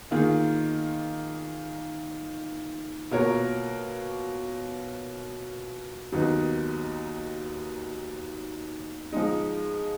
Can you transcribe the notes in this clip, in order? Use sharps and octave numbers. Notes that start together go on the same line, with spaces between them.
D#3 A#3 F4 G#4
B2 A#3 F4 A#4 C#5
D#2 D#3 F#3 B3 D#4
F3 G#3 D#4